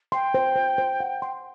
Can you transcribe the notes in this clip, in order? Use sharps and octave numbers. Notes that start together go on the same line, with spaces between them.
G5 C6
C5
C5
C5
F#5
C6